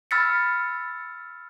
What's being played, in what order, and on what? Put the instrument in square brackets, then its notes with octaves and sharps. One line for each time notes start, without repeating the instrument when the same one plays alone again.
[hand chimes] B5 E6 F6 A6 B6 C#7